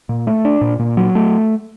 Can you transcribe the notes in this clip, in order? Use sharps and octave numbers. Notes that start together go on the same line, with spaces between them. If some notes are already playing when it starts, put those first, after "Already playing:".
A#2
A3
D4
A#2
A#2
F#3
A3